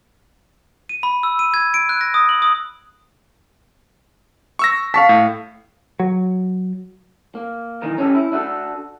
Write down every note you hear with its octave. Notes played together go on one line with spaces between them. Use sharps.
D#7
B5
E6
D#7
G#6
D7
F#6
A#6
D#6
F#7
D#6
C#6 E6 A#6
F5 A5 C#6 B6
A2
F#3
A#3
B1 D#3 E3 A#4
C#4 G4 A4
E4
D4 E4 F#4 A4